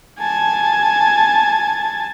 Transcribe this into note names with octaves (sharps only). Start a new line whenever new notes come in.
G#5 A5